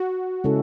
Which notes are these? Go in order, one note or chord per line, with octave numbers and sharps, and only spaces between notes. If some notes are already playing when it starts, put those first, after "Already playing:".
Already playing: F#4
C#3 G#3 C#4 E4 A4